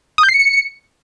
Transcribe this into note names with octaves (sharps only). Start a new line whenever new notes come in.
D#6
G6
C7
C#7